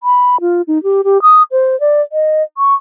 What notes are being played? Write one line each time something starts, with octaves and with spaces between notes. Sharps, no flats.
B5
F4
D#4
G4
G4
D#6
C5
D5
D#5
C#6